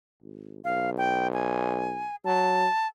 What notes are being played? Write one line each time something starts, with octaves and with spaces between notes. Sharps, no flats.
G#1
B1 F5
G5
G#5
F#3 A5